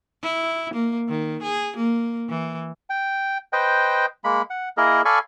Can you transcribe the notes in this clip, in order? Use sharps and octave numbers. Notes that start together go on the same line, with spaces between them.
E4
A#3
D#3
G#4
A#3
E3
G5
B4 C5 D#5 G5
G#3 A#3 B5
F#5
A#3 E4 G#4 A#4 D#5
A4 D5 F5 G#5 B5 C#6